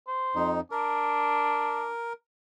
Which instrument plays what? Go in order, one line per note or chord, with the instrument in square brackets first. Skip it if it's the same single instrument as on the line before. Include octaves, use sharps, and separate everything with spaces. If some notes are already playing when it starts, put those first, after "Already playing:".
[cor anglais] C5
[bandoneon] F2 D#4
[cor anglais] D4 [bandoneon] A#4